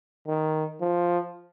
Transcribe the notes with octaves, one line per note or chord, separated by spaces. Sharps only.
D#3
F3